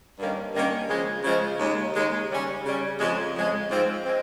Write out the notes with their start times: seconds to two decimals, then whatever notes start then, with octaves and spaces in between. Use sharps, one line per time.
0.19 G2 D#3 A#3 C#4
0.53 G2 D#3 A#3 C#4
0.89 C#3 F3 G#3
1.24 C#3 F3 G#3
1.60 D#2 C#3 G#3
1.95 D#2 C#3 G#3
2.29 C#3 G3 C#4
2.65 C#3 G3 C#4
2.99 F2 C#3 G#3
3.35 F2 C#3 G#3
3.70 G#2 F3 G#3 C4
4.05 G#3 C4